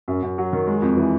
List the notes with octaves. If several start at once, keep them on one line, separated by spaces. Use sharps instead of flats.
F#2
F#2
F#3
D#3
G#3
F2
E3